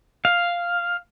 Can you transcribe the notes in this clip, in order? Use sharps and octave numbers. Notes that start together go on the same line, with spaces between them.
F5